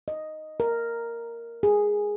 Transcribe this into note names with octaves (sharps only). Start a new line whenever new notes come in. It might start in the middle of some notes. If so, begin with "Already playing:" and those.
D#5
A#4
G#4